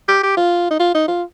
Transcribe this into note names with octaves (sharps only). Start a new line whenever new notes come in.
G4
G4
F4
D#4
F4
D#4
F4